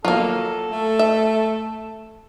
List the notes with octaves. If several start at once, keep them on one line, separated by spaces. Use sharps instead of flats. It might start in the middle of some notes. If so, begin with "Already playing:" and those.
F#3 A#3 F4 A4 F5
A3
E5